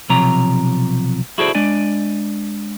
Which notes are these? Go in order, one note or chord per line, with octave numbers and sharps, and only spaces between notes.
B1 C3 F3 C#5 A#5
E4 F#4 G#4 A4 C5 D5
G#3 D4 D5 G#5